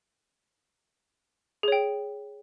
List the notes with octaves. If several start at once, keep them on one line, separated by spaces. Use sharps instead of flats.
G#4 C#5 G5